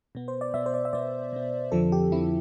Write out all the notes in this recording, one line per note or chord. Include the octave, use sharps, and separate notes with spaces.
B2 B3
C5
D5
B2 B3 E5
C5
D5
E5
B2 B3 D5
B2 B3
F2 D3 F3 C4 A4
G4
F2 D3 F3 C4 E4